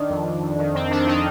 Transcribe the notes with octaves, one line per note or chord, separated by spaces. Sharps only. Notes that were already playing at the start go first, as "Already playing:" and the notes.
Already playing: D#3 D4
F2
F2
F2
D#3
F2 C4
D#3 D4
D#3 D#4